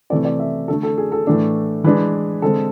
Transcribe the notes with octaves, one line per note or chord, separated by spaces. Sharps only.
C3 E3 A3 C4 D5
D5
E5
D3 A3 D4 A4
A4
G#4
A4
A2 E3 A3 D4
E3 G#3 D4 B4
D3 G#3 C4 A4